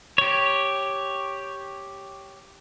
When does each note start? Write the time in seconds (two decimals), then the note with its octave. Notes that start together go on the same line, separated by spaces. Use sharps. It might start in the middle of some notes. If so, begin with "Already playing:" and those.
0.18 G4 C#5